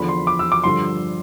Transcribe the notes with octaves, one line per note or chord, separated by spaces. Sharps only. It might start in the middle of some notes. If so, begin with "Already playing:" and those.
Already playing: E2 D3 F3 B5
C6
D6
E6
D6
G2 D3 F3 C6